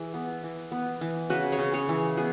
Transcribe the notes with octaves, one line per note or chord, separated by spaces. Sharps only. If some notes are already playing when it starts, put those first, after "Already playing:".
Already playing: E3 G#4
B3
E3
B3
E3
C#3 F#4 B4
G#4 C#5
C#3
G#4 C#5
E3
B3 G#4